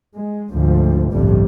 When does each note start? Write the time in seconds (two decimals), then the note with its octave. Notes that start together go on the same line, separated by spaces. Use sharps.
0.15 G#3
0.51 D2 G#2 F3
1.13 G1 C2 F2 A2 G3